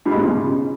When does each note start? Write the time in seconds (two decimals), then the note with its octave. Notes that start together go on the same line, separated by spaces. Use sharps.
0.06 G2
0.11 G#2
0.17 B2
0.23 C#3